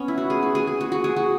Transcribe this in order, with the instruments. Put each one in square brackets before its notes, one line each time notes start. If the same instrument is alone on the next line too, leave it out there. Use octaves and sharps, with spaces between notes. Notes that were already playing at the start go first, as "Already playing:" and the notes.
Already playing: [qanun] B3 C#4
E4
F#4
G#4
F#4
G#4
G#4
F#4
F#4
G#4
F#4